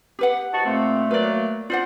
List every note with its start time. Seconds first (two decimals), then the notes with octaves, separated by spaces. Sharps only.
0.19 G4 B4 F#5
0.53 F3 D#4 F#4 A5
0.66 A#2 A3 C4
1.11 F#3 A#3 B4 D5
1.70 D4 F4 C5 F#5